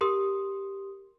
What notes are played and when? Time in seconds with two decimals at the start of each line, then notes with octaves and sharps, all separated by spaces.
0.01 G4 A#4 C6 D#6